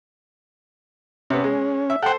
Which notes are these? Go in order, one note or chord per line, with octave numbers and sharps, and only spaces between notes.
C3 B3 C#4
G#3
E5
A4 C5 F#5 G5